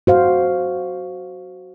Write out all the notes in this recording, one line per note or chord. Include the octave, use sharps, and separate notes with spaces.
F#4 C5 F5